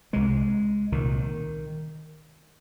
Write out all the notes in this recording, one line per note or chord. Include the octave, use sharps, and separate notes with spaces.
C2 C3 G#3
C2 A#2 D#3